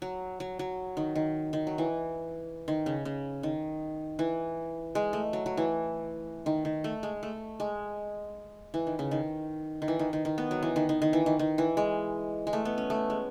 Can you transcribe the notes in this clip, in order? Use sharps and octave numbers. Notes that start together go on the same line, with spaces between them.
F#3
F#3
F#3
D#3
D#3
D#3
F#3
E3
D#3
C#3
C#3
D#3
E3
G#3
A3
F#3
F#3
E3
D#3
D#3
A3
G#3
A3
G#3
E3
D#3
C#3
D#3
D#3
E3
D#3
D#3
D#3
B3
F#3
E3
D#3
D#3
D#3
E3
D#3
D#3
E3
G#3
G#3
A3
B3
C#4
A3
G#3